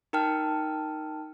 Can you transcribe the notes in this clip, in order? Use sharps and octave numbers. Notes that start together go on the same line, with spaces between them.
D#4 A#4 G5 A5 F6